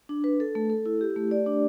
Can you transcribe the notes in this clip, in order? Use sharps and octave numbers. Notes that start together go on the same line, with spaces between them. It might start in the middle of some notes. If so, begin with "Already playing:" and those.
D4
B4
A4
A3
A4
E4
G4
A3
D5
D4